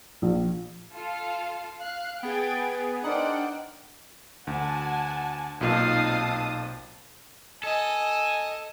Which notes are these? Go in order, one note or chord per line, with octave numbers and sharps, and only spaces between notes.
A#1
F4 A4 F5
F5 F#6
B3 G#4 G5 G#6 A6
D4 D#4 A#4 C5 D5 F#5 G5
D2 F#5 G#5 A5
B1 A#2 C4 D#4 F5 A5 D#6
A4 D#5 G#5